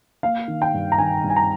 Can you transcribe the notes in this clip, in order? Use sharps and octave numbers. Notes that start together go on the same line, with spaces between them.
A#3 F5
D#3
G5
G2
A#5
D#3 G#5
G2
G#5
A#5